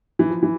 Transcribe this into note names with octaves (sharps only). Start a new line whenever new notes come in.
E3
F3
E3